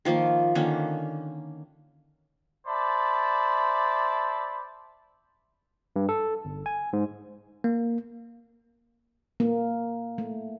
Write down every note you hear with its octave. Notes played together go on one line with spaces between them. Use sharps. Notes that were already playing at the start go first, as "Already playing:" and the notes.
D#3 F3 A#3
D3 D#3 A#3 C#4
C5 D5 E5 A5 B5
G2
A4
G1
G#5
G#2
A#3
A#3
A3